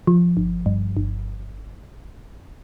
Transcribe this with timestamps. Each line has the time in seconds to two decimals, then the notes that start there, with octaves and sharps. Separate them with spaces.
0.07 F3
0.37 G1
0.66 G2
0.97 G1